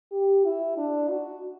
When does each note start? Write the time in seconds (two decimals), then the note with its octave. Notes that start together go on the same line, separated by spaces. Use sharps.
0.12 G4
0.45 E4
0.77 D4
1.10 F#4